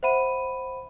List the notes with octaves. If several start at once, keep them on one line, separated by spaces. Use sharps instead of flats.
C5 E5 F#5 B5 D#7